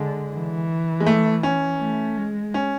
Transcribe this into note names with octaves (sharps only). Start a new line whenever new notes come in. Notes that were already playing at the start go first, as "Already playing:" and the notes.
Already playing: D3 G#3
E3
G#3
A3
C#4
A3
G#3
C#4